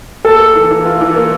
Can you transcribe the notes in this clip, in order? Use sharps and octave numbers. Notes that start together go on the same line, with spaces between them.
A#3 A4
A#3
E3
E3
F4
E3
A#3